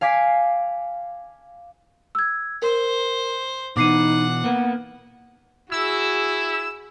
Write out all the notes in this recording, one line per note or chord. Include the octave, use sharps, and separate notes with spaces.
F5 G#5 D6 B6 C7
E6 G#6
A#4 C5
B2 E3 D#4 F#5 D6 C7 D#7
A#3 B3 F#5
E4 F#4 G#4 E6